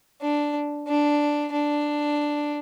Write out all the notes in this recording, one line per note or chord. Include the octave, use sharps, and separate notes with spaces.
D4
D4
D4